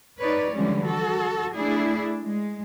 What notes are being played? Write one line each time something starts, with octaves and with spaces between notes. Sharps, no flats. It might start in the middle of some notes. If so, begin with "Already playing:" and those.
D#4 B4 C#5 D5
D3 E3 F3 G3 G#3 C#4
F#4 A4
A3 D4 E4 G#4
G#3